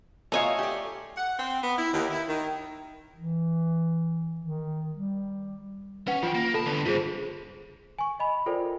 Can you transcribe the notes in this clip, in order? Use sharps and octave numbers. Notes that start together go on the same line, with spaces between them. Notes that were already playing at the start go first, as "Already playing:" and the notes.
B2 A3 F4 C#5 D#5 F5 G#5 A#5
G4 D5
F#5
C4
B3
E4
D#2
E4
D#3
E3
D#3
G3
C#4 B4 F#5
F3 F4 G5
A#3
C3 A4 A5 B5
D3 B3
G2 C#3 F4 G#4 C5
G#5 C#6
D#5 G#5 B5
F4 A4 A#4 C5 D5 G5